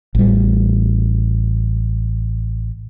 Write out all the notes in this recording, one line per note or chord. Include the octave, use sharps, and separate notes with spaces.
A1 G3